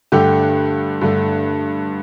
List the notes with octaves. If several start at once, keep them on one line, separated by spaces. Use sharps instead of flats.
G2 D3 A3 G4
G2 D3 A3